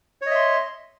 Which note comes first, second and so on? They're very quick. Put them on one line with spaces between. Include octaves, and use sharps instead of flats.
C#5 D#5 E5 C6